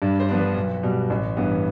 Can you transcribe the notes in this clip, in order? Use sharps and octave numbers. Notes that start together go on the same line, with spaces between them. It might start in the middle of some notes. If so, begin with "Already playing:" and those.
G2 D5
C5
F3 B3 D4
B4
B1
B2 G3
A1
G2 E3 B3